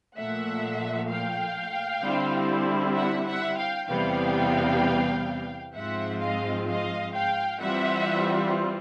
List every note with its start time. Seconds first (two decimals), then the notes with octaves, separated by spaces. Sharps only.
0.16 A#2 F3 A3 E5 F#5
1.09 F5 G5
2.04 D3 G3 C4 E4
2.95 E5 F#5
3.27 E5 F#5
3.58 F5 G5
3.89 E2 C3 E3 G3 B3 F5 G5
5.75 G#2 F3 G#3 C4 F4 E5 F#5
6.22 D#5 F5
6.68 D#5 F5
7.14 F5 G5
7.61 E3 G3 C4 F4 E5 F#5